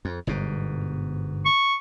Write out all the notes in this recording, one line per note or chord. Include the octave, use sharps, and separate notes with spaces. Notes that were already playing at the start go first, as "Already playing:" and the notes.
F2
G1 G#2 B2
C#6